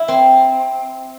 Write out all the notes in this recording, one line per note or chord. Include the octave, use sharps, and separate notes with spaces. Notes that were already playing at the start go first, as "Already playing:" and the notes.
Already playing: E4
C4